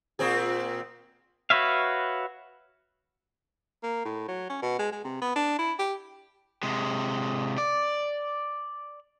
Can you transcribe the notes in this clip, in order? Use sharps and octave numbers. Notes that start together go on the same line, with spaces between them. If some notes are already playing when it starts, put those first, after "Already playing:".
A#2 C4 G#4
F#4 B4 C#5 E5 F5
A#3
A2
F#3
C#4
B2
G#3
G#3
C3
B3
D4
E4
G4
C3 G#3
D5